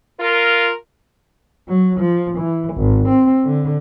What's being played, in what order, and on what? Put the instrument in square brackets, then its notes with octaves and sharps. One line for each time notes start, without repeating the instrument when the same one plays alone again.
[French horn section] F4 A#4
[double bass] F#3
F3
E3
G#1
C4
D3